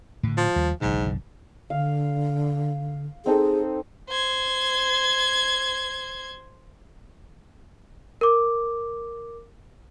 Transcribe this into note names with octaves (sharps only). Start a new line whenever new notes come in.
A2 D3
F3
D#2 G3
F#1 B1 G#2 D3
D3 F5
C4 D#4 G#4 A4
C5 G#6
A#4 D6